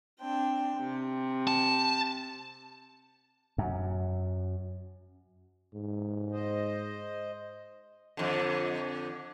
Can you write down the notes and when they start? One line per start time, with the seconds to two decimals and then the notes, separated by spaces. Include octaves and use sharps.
0.21 C4 D4 G5
0.77 C3
1.47 A5
3.58 F#2
5.74 G#2
6.32 C5 D#5
8.17 F2 D3